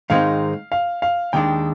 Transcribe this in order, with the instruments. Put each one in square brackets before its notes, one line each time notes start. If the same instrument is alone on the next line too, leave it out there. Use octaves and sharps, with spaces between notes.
[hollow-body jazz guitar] G#2 D#3 G#3 C4 D#4 [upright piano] F5
[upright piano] F5
F5
[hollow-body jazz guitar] D#2 D#3 G#3 D4 [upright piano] G5